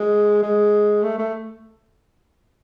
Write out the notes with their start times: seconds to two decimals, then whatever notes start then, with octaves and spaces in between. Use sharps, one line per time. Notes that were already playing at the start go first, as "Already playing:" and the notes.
Already playing: G#3
0.43 G#3
1.03 A3
1.18 A3